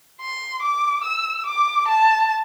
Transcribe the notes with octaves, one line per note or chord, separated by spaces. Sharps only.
C6
D6
E6
D6
A5